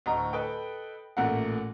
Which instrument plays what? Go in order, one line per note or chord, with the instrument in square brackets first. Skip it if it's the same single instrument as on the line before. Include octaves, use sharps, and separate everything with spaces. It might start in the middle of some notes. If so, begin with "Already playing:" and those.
[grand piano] D2 A2 D#5 A#5
A4 B4 D#5 G5
A1 A#2 A3 A#4 F#5